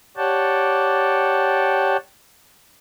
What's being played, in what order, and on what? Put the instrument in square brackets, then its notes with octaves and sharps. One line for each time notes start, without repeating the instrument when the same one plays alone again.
[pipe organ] G4 C#5 D5 F#5 G5 A5